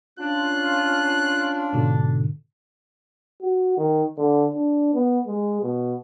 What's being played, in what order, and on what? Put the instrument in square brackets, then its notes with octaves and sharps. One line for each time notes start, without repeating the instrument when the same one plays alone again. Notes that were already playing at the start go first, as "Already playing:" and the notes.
[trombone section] C#4 F4 [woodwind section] D4 [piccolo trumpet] F#6
[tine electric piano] G#2 B2 D3
[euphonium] F#4
D#3
D3
D4
B3
G#3
B2